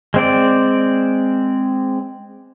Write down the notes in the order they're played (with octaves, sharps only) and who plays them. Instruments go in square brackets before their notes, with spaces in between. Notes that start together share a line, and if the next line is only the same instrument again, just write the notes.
[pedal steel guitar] G#3 C4 D5